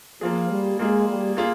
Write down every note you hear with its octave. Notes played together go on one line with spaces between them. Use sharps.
F3 A#3 F4 G#4
G3
G#3 A#3 F4 G#4
G3
A#3 F4 G#4